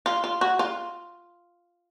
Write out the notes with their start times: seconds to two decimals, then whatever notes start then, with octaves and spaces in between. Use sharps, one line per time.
0.06 F4
0.24 F4
0.41 F#4
0.59 F4